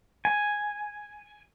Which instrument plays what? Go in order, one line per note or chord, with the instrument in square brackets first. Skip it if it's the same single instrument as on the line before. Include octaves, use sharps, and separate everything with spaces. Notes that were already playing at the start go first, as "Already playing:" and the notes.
[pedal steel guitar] G#5